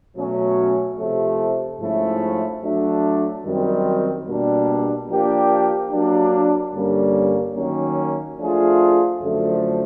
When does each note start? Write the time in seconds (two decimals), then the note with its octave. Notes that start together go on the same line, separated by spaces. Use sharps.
0.15 B2 F#3 A3 C#4 F#4
0.97 C3 F3 A3
1.80 G#2 F3 A3 C#4 E4
2.62 F#3 A3 D4
3.45 F#2 D#3 G3 C4
4.27 B2 G3 A#3 D4
5.09 F3 A#3 D4 G4
5.92 F#3 A#3 D4
6.73 G2 D3 G3 A#3 C#4
7.56 D#3 F#3 A#3 C#4
8.38 F3 A3 D4 F4 G#4
9.21 F#2 D3 F3 A3